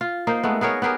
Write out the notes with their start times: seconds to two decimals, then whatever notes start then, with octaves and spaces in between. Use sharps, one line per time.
0.01 F4
0.27 A#3 D#4 C5
0.43 G#3 A3 B3
0.61 B3 G#4 A#4 C#5
0.82 B3 G4 G#4 A#4